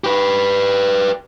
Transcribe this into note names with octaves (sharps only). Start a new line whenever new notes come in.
G4 B4